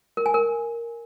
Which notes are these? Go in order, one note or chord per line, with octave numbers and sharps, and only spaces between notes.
A#4
G#5
A#4